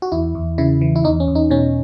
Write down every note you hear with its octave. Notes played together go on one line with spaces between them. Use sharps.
F#4
E2 E4
E2
C#3 E4
E3
E4
E2 D#4
C#4
E2
D#4
B2 C#4